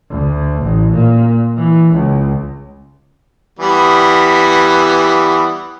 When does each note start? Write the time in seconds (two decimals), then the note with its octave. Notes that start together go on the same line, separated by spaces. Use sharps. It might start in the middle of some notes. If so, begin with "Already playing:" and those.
0.10 D2
0.62 A1
0.93 A#2
1.57 E3
1.93 C#2
3.59 E3 G3 B3